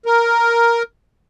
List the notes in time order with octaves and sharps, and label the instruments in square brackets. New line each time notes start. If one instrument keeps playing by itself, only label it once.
[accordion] A#4